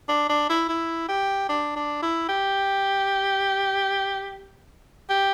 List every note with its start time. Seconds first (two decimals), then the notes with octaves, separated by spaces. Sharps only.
0.09 D4
0.30 D4
0.49 E4
0.69 E4
1.09 G4
1.49 D4
1.76 D4
2.02 E4
2.29 G4
5.09 G4